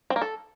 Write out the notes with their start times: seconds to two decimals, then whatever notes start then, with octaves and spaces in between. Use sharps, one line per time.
0.10 C4
0.16 A#3
0.22 A4